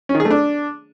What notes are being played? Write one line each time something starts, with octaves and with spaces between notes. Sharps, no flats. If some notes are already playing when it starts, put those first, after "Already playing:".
C#4
D#3
G#4
A3
D4